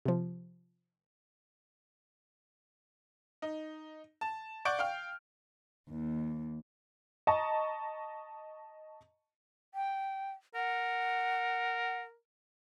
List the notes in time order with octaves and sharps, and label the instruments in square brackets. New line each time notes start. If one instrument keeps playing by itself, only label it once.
[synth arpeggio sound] C3 F3
[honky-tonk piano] D#4
A5
D5 F#5 C#6 G6 D7
F5 G5 F6
[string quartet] D#2
[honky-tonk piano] D#5 A5 A#5 C#6
[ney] G5
[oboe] A#4 [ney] F#5